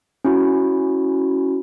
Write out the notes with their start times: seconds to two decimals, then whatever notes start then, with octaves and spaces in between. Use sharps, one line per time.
0.25 C#4 E4 F#4